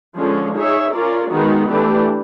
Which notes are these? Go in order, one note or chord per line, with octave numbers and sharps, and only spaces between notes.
D3 F3 G#3 C#4
D#4 G#4 C#5 E5
C#4 F4 A#4 D5
D#3 G#3 B3 D#4 F#4
E3 A3 D4 G4